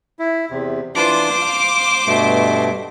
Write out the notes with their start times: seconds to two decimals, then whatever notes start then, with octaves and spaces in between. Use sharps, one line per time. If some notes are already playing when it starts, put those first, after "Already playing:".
0.19 E4
0.50 E2 C3
0.95 E3 D4 F4 C5 D6
1.42 F5 F6
2.06 G2 B2 A3